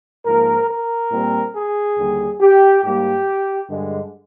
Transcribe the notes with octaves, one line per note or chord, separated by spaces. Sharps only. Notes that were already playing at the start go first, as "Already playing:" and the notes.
G#2 F3 A#3 A#4
A#4
A#2 G3 C4
G#4
D#2 D3 G3
G4
G#2 G3 A#3 G4
G2 D3 G#3